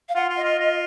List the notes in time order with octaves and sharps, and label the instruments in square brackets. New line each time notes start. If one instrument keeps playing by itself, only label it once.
[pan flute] F5
[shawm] F4 [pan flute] F#5
[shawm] F4
[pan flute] D#5
[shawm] F4
F4